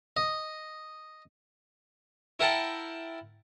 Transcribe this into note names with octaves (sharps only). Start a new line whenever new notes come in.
D#5
E4 A#4 F#5 G5 A5